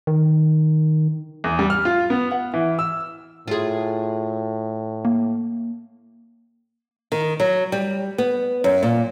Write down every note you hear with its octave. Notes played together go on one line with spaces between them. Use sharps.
D#3
E2
G3
F6
F4
B3
F#5
E3
E6
A2 F4 G#4
A#3
D#3
F#3
G3
B3
F#2
A#2